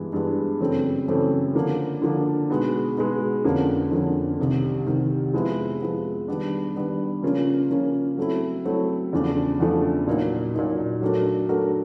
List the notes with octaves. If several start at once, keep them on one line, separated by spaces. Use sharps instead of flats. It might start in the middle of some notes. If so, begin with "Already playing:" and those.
Already playing: G2 E3 G#3 B3
G2 E3 G#3 B3
F#2 C#3 E3 A3 C4
F#2 C#3 E3 A3 C4
D3 F3 A#3 D4
D3 F3 A#3 D4
B2 G#3 B3 D#4
B2 G#3 B3 D#4
F2 D3 F3 A#3 C#4
F2 D3 F3 A#3 C#4
C2 C3 D#3
C2 C3 D#3
F3 G#3 B3 E4
F3 G#3 B3 E4
D#3 G3 B3 D4
D#3 G3 B3 D4
C#3 F3 A#3 C#4 F4
C#3 F3 A#3 C#4 F4
F#3 A3 C4 E4
F#3 A3 C4 E4
E2 C#3 F3 A3 D4
E2 C#3 F3 A3 D4
A#2 F#3 A#3 D#4
A#2 F#3 A#3 D#4
F#3 A3 D4 F#4 A#4
F#3 A3 D4 F#4 A#4